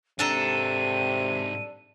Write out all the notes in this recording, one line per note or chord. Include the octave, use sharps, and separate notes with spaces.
G#2 C3 D4 A4 G5 A#5 D#7